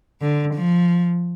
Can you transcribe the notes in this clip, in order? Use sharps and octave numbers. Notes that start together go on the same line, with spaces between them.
D3
F3